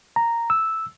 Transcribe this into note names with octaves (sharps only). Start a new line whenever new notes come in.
A#5
E6